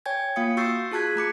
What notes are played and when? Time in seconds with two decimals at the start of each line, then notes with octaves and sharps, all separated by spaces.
0.06 C#5 G5 G#5 G#6
0.36 A#3 F4 F5 D#6 C#7
0.57 F#4 C#6 E6 G6 A6 C7
0.92 F4 G#4 A5 F#6 G#6 B6
1.16 A3 A#5 D6 C#7